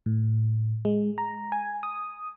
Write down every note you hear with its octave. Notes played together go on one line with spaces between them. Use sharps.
A2
G#3
A#5
G#5
D#6